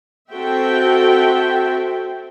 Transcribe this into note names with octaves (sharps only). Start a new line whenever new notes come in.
C4 F#4 A4 E5 G5